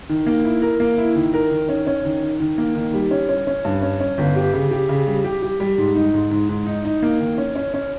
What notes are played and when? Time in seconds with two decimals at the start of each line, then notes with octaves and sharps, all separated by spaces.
0.09 D#3
0.26 A#3
0.44 E4
0.62 A#4
0.80 A#3
0.98 E4
1.16 D#3
1.34 A#4
1.51 D#3
1.69 C#4
1.87 C#4
2.05 D#3
2.22 D#3
2.40 D#3
2.58 A#3
2.76 D#3
2.94 G3
3.11 C#4
3.29 C#4
3.47 C#4
3.65 G2
3.82 C#4
4.00 C#4
4.18 G1
4.36 G4
4.53 C#3
4.71 G4
4.89 C#3
5.07 G3
5.24 G4
5.42 G4
5.60 G3
5.78 G#2
5.95 D#4
6.14 G#2
6.31 G#2
6.49 G#2
6.67 D#4
6.85 D#4
7.02 A#3
7.20 D#3
7.38 C#4
7.55 C#4
7.74 C#4